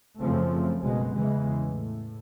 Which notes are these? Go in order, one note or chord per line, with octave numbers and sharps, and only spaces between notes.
F#2 C#3 F3 A3 C4
F#1 B2 G#3
E2 C#3 E3 G#3
A2